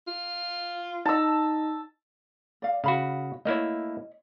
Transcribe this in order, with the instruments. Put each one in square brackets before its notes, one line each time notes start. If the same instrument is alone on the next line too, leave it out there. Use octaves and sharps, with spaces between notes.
[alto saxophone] F4
[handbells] D#4 D#5 [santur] A5 E6
[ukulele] D5 F5
[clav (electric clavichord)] C#3 F#4 [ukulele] F5 B5
[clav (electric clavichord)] A3 A#3 E4 [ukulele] C#5 D#5